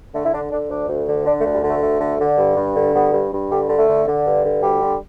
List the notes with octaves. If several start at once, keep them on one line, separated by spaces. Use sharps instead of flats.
D3 A3
E4
D3 D4
D3 D4
D2 D4
D2
D3
D3 D4
A3
D2
G3
D3 A3
D2 A3
D3
D3
G2
G2
D3
G2 B3
G2
G2
D3 G3
D3
A3
D3
D3
G2
D3
D2 G3
D3